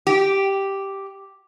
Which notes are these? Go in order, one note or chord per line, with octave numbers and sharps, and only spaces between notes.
G4